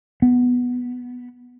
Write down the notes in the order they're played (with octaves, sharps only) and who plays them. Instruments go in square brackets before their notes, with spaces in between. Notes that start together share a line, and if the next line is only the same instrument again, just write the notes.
[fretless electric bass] B3